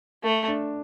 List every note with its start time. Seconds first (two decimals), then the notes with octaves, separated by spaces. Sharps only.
0.23 A3
0.48 D4